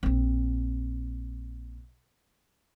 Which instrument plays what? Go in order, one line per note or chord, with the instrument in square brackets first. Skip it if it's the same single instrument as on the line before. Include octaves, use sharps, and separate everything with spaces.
[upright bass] A#1 C4